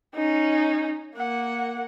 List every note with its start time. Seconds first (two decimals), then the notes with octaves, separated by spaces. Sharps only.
0.15 C#4 D#4
1.17 A#3 F#5